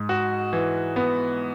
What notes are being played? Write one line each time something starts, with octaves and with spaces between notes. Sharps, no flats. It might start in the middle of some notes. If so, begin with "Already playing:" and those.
Already playing: G#2
F#4
E3
B3